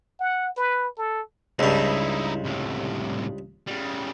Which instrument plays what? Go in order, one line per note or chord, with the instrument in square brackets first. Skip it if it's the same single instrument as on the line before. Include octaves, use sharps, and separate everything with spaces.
[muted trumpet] F#5
B4
A4
[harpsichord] C#2 G2 [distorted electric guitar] D#4 E4
[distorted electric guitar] C2 A2
C#3 G3